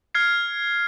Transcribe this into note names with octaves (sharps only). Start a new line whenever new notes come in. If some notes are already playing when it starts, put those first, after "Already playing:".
F6 G#6 C7